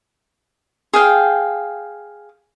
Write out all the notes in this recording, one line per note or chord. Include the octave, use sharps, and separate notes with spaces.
G#4 F5 G5